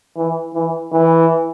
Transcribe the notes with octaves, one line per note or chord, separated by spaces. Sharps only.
E3
E3
E3